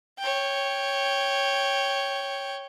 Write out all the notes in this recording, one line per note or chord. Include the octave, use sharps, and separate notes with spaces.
C#5 G5